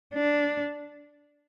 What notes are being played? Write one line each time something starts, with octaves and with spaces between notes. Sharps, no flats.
D4